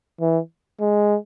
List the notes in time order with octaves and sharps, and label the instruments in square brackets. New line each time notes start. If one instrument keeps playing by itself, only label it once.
[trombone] E3
G#3